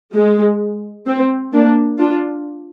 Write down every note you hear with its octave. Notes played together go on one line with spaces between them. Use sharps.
G#3
C4
A#3 D4
D4 F4